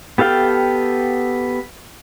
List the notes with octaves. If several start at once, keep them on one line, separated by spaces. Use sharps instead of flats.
B3 G4 A4 F5 G5